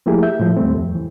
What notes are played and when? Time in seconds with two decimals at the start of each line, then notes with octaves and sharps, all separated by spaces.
0.06 F3 A3 A#3 E4 G4 G#4
0.23 E5 G6
0.40 A2 F3
0.57 D#2 G3 A3 C4
0.77 F2
0.95 E3